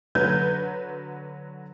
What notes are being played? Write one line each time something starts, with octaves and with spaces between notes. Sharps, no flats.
D3 F#3 B4 G6 G#6